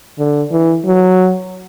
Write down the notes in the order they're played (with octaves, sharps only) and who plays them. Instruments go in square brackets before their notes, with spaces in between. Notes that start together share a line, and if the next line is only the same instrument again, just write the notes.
[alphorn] D3
E3
F#3